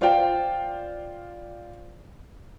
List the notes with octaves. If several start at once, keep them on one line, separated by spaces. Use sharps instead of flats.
F4 C5 D5 F5 G5